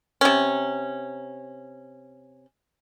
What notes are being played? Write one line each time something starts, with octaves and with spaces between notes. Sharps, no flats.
C3 C#4